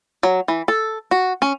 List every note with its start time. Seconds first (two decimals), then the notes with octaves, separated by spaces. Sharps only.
0.23 F#3
0.48 E3
0.68 A4
1.11 F#4
1.42 C#4